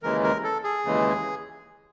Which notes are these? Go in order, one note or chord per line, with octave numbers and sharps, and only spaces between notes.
D#2 C#3 E3 G#3 A#4
A#4
A4
G#4
D#2 C#3 E3 G#3